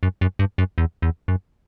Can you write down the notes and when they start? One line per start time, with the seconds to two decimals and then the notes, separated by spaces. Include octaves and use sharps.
0.03 F#2
0.21 F#2
0.39 G2
0.58 F#2
0.78 E2
1.02 E2
1.28 F#2